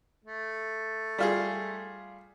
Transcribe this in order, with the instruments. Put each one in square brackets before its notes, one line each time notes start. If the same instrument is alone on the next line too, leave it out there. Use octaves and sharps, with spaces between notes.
[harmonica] A3
[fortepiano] G3 F4 G#4